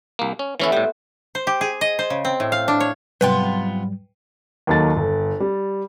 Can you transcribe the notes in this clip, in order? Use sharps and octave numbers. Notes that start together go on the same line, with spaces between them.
C2 A#3
C#4
E3 A3 B3 C#4 E4 A4
A2 G3 B3 C5
C5
G4
G#4
D#5
C5
C#3
C4
A2
F5
D4
C#5
G#2 C3 F#3 G3 B3 F4 B4 G5
D#2 D#3 F#3 A4 A6
G1
G3